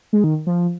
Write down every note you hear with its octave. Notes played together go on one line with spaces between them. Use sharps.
G#3
D#3
F3